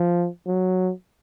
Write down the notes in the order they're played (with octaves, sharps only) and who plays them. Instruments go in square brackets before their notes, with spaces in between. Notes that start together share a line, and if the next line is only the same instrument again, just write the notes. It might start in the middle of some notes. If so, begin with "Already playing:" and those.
Already playing: [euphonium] F3
F#3